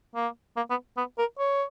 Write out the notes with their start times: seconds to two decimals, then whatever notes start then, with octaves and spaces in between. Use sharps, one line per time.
0.15 A#3
0.57 A#3
0.70 B3
0.97 B3
1.18 A#4
1.39 C#5